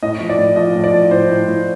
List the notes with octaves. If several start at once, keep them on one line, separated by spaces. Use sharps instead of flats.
A2 D#5
F3
D5
A2
F3 D#5
A2
D5
F3
A2 C5
A2
A2